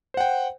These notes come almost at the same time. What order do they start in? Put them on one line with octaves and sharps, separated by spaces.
C5 F#5 G5